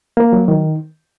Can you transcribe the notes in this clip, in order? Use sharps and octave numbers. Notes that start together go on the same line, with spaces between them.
A#3
F#3
D#3